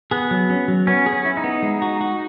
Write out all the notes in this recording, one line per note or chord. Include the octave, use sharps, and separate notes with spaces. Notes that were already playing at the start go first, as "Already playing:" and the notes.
B3 G#4
F#3
C#4
F#3
B3 C#4
G#4
C#4
E4
D#4
B3
G#3
F#4
F#4